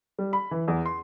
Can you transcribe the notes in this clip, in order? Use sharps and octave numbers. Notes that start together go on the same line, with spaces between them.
G3
B5
E3
E2
C6